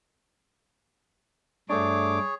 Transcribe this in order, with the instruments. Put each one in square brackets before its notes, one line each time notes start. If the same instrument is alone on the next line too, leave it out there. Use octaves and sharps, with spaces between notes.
[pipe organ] G2 D6 [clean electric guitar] A3 D4 [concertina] G#4 C#5